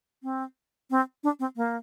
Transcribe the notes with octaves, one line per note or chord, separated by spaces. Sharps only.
C4
C4
D4
C4
A#3